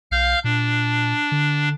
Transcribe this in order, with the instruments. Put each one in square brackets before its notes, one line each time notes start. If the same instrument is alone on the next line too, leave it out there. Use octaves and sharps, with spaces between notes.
[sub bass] B1 [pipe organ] F5 F6 G6
[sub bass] A#2 [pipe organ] D4
[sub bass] D3